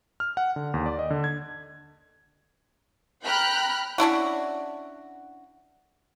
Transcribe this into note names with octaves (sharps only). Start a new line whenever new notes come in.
F6
F#5
D3
D#2
D5
D#5
D3
G#6
G5 A#5 B5 F6 F#6
C#4 D4 E4 F#4